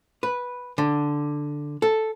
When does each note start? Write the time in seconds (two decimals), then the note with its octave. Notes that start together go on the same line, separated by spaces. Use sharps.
0.23 B4
0.78 D3
1.82 A4